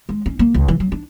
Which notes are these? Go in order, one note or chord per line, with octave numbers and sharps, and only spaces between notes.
G#3
C#4
A#3
C#2
E3
F#3
D4